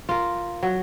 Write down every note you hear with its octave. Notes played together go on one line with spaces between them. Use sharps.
F4 A#4
F#3